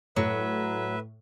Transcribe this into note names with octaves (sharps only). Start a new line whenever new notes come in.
A2 F#3 B4 E5